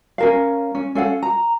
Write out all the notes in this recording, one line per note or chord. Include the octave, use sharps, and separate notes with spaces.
C#4 A#4 F5
C#4
C#4 A4 F5 F#5
A#5